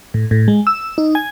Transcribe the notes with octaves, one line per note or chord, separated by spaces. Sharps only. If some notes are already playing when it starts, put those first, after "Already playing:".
A2
A2
G#3
E6
D#4
G#5